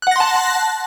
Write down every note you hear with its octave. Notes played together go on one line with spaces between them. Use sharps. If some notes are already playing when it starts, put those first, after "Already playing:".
F#5 A5 C6 F#6 A#6